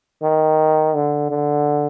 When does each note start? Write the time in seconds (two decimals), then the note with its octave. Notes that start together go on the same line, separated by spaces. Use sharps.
0.23 D#3
0.95 D3
1.31 D3